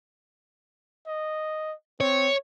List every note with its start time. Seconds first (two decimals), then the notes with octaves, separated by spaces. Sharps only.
1.07 D#5
2.01 C4 C#5